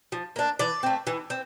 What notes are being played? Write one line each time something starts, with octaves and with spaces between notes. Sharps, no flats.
F3
A#3 D4
E3 D5
A3 C4
E3
C4